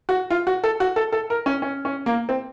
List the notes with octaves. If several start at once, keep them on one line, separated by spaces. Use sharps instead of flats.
F#4
F4
F#4
A4
F#4
A4
A4
A#4
C#4
C#4
C#4
A#3
C4